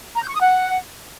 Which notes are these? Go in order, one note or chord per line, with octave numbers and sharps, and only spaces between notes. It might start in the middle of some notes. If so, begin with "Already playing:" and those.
A#5
G6
C#6
D#6
F#5